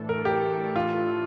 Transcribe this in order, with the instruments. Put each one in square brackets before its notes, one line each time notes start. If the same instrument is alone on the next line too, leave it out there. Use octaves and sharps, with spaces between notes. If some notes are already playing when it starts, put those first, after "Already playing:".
Already playing: [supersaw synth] A2 E3 A3 D4 A4
[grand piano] A#4
G4
F4